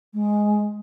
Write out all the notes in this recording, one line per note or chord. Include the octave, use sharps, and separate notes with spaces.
G#3